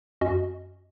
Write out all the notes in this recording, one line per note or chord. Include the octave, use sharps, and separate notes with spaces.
F#2 C#4 F#4 D#5